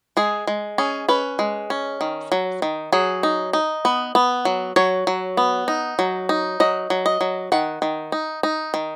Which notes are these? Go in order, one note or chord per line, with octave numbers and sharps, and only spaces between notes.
G#3 G#4
G#3
C#4 G#4
C#4 B4
G#3
C#4
D#3
F#3
D#3
F#3 G#4
D#4
D#4
B3
B3
F#3
F#3 C#5
F#3
B3
D#4
F#3
D#4
F#3 D#5
F#3
D#5
F#3
D#3 F#5
D#3
D#4
D#4
D#3